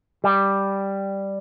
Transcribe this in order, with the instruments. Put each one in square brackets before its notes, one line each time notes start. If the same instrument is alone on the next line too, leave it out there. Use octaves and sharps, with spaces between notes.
[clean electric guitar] G3